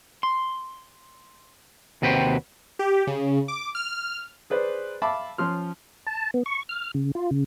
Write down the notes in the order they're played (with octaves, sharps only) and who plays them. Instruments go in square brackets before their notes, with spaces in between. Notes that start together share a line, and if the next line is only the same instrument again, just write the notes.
[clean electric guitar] C6
D#2 C3 F#4 B4 C5 G5
[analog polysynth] G4
C#3
D6
F6
[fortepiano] G#4 B4 C5 D5
E5 F5 A5 B5 D6
F3 C#4 C6 F6
[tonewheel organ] A5
B3
C#6
F6
C#3
F4
C#3